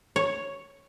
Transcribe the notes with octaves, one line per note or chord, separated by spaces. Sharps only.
C#5